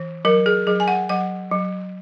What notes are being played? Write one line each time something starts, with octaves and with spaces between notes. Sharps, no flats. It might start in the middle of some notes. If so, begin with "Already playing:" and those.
Already playing: E3
F#3 A#4
G#4
F#3 G#4
G#5
F#5
F#3 F#5
F#3